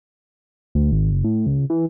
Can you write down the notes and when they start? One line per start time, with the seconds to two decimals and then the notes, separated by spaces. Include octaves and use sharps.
0.75 D2
0.92 G#1
1.12 F#1
1.24 A2
1.46 C#2
1.70 E3